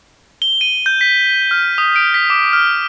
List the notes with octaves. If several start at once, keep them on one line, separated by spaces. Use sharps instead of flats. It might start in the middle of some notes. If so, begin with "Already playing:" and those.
G7
D#7
G6
B6
F6
D#6
D7
B6
D6
F6